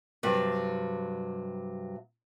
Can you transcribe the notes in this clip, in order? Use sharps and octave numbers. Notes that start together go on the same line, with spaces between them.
G2 C3 F#3 G3